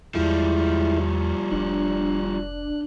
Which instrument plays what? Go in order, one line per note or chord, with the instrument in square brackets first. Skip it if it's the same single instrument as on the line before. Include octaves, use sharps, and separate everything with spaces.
[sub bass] E2 [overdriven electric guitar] F3 G3 [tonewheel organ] G#3 E4
[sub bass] F1 [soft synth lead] D4 [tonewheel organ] F#6